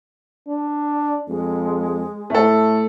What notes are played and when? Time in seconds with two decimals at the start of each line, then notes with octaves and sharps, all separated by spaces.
0.47 D4
1.28 F2 G#3
2.30 A2 A3 A4